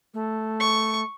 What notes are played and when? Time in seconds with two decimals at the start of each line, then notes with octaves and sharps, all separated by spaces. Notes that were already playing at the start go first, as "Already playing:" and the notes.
0.14 A3
0.60 C#6